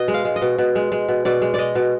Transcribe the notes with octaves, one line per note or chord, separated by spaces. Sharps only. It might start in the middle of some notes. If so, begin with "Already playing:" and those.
Already playing: B2 D#5
G#3
F5
G#3
D#5
B2
B2
G#3
G#3
B2
B2 D5
G#3
G#3 D5 D#5
B2